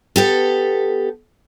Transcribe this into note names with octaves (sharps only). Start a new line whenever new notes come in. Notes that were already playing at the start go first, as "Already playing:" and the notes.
B3 G4 A4